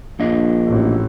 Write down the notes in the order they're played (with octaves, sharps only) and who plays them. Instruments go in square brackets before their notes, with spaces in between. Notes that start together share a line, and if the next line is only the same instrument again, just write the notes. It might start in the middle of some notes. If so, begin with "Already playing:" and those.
[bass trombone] A#1 [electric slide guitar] A#3 D4 D#5
[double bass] A1